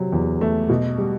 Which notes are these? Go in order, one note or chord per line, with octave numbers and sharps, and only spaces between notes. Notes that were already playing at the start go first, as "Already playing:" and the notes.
Already playing: C3 F#3
E2
A3
B2
G3